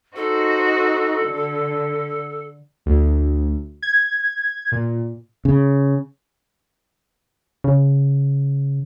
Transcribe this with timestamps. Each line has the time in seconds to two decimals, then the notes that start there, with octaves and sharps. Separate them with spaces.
0.16 D#4 F#4 A4 C5
1.25 D3
2.86 D2
3.82 G#6
4.72 A#2
5.45 C#3
7.64 C#3